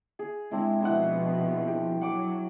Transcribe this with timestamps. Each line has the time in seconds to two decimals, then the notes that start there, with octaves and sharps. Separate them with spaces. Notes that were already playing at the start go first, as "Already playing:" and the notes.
0.19 G#4
0.51 G#3 C4 D4 E4
0.81 B2 F3 E4 C5 F#5
1.67 G4
2.01 F#3 F#5 D6